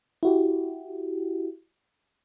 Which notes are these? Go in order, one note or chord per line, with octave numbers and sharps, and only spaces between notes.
E4 F#4 G4